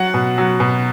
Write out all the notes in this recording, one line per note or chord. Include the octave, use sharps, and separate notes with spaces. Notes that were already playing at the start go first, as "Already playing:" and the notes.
Already playing: F#3 F#5
B2
F#3
B2